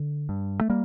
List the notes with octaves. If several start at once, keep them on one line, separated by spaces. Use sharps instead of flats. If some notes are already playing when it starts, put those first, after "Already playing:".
Already playing: D3
G2
A3
G3 A#3